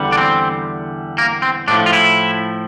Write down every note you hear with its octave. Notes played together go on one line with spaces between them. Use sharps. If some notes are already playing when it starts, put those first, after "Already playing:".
Already playing: E2 D3 G3
D4
C4
A#3
C4
A2 F3 D4
F4
E4